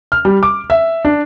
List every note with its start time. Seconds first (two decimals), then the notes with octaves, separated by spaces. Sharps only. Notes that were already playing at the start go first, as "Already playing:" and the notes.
0.12 F6
0.25 G3
0.43 D6
0.70 E5
1.05 D4